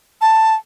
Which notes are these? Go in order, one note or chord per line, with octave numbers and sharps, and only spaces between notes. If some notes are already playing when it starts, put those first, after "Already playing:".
A5